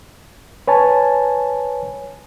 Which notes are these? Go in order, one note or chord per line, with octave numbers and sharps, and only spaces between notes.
B4 C#5 G#5 A5